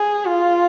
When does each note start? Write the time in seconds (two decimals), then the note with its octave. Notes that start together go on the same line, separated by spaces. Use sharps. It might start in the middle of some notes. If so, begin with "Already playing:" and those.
Already playing: G#4
0.25 F4